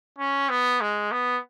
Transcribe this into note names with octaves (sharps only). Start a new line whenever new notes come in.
C#4
B3
G#3
B3